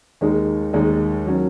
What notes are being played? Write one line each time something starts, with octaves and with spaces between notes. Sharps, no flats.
D#2 D#3 G#3 D#4
D#2 D#3 G#3 D#4
D#3 F#3 C#4